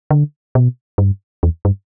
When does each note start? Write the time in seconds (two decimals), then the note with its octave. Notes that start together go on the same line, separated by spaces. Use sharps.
0.11 D3
0.55 B2
0.98 G2
1.43 E2
1.65 G2